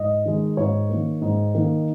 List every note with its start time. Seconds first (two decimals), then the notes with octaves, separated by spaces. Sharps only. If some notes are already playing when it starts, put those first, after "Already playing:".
Already playing: G#2 D#5
0.26 D#3 G#3
0.57 G#2 C#5
0.89 D#3 A#3
1.21 G#2
1.55 D#3 A#3